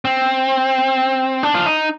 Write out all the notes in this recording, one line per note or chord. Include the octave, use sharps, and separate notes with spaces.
C4
D4
F4
D#4